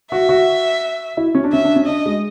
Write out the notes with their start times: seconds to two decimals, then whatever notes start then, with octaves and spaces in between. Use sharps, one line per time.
0.11 F#4 E5
0.29 F#4
1.17 E4
1.35 C#4
1.44 D4
1.52 C#4 E5
1.65 D4
1.76 C#4
1.87 D4 D#5
2.06 G#3